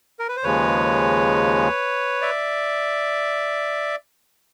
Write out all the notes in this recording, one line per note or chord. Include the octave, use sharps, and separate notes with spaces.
A#4
B4
C5
D#2 C#3 F3 G#3 B4 C#5
D5 E5